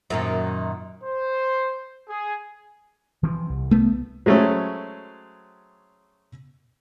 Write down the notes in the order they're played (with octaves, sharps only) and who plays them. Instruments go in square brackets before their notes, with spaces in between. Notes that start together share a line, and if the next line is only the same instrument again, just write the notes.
[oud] F#2 A#2 D#3
[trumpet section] C5
G#4
[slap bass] E3 F3 C4
C2
[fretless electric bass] A3 B3
[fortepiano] F#3 G#3 A3 C4 C#4